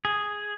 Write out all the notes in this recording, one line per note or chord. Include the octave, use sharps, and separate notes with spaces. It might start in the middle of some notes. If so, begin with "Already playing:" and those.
G#4